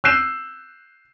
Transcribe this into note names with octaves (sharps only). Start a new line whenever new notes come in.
E6 F#6 G6 C7 E7